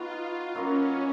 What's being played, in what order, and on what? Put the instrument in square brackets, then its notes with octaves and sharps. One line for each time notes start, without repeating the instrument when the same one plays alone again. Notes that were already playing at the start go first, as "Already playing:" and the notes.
Already playing: [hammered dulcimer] B3 D#4 F#4 [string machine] F4
[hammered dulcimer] F#3 A#3 F4 A#4 [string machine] C#4